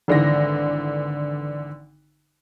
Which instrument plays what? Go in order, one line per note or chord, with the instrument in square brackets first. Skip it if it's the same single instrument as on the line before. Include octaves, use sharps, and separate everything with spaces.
[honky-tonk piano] G#1 D3 E3 A#6